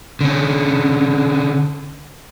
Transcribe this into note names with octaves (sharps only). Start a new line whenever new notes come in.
D3 C#4